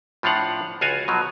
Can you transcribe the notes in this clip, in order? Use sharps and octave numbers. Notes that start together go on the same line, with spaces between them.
A2 F3 D4 F5 F#5
C#2 F4 F#4 F5 G#5
B2 F3 F#3